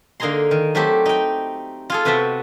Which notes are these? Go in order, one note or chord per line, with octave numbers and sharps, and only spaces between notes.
D3 A#3 D#4 G#4 A#5 C6
D#3
F#3 A3 C4 G4
D#4 G5
F4 G#4 A4
C3 B3 F#4 E5 G5 A5